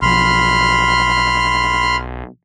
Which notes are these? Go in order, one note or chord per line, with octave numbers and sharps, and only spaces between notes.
B1 F3 B5 C6 F6